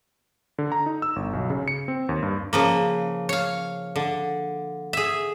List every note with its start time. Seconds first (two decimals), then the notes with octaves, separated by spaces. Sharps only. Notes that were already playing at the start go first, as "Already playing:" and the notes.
0.58 D3
0.72 A#5
0.86 D#4
1.02 E6
1.16 G1
1.33 B1
1.50 C#3
1.68 C#7
1.88 C4
2.09 D#2
2.23 G2
2.53 C#3 F3 A#3
3.29 C#5 F5
3.96 D3
4.93 G#4 E5